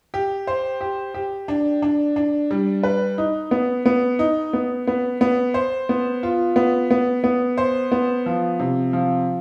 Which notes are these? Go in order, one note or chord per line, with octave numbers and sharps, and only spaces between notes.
G4
C5
G4
G4
D4
D4
D4
G3
B4
D#4
B3
B3
D#4
B3
B3
B3
C5
B3
F4
B3
B3
B3
C5
B3
F3
C3
F3